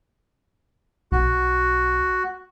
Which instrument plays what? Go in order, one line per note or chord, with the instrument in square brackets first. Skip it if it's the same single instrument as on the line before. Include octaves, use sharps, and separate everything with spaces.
[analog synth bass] B1 [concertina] F#4